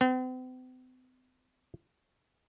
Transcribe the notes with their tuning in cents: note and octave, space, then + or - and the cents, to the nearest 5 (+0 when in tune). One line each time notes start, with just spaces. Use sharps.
C4 -45